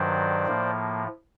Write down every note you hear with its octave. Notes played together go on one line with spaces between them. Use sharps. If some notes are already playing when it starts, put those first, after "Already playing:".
Already playing: G2 D#3 F#3 C5 D5
A2 F3 A#3